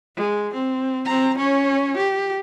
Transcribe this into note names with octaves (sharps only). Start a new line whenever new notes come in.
G#3
C4
C4 A#5
C#4 C#5
G4